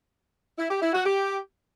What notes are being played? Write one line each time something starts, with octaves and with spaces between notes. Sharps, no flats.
E4
G4
E4
F#4
G4